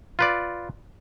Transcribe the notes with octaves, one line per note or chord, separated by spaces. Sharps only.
F4 B4 D5